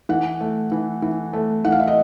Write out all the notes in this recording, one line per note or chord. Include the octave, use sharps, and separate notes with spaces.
E3 F#5
A3
E3
E3
A3
E3 F#5
F5
E5
D#5